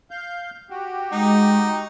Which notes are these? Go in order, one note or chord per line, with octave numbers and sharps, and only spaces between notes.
F5 G6
F#4 G4
G#3 D#4